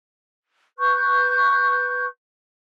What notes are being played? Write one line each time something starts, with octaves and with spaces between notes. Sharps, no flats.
B4 C#6 F#6 G6